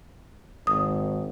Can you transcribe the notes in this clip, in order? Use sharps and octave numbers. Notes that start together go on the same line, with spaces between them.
G#1 D#6